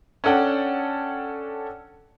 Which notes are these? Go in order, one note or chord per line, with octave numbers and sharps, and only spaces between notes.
C#4 D4 A4 F#5 G5